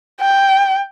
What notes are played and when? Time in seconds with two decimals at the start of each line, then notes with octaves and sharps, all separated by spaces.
0.21 G5